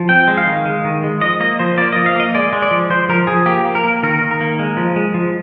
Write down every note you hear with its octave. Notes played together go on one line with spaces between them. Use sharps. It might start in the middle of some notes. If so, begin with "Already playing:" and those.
Already playing: F3
C4 G5
G#3
F5
D#3
G#3
D#3
G#3
F3 D#5
A#3 D#5
F3 C5
A#3 D5
F3 D#5
F5
A#3 D#5
G#3 D5
G#3
D5
F3
F3 C5
F3 A#4
F3 G#4
A#3 G4
A#3
A#4
A#3
D#3 A#4
D#3
A#4
A#3
G#3
F3
G#3
F3